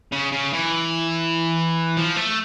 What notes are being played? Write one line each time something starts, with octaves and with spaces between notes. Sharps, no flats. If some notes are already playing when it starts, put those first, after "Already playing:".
C#3
C#3
E3
F3
A3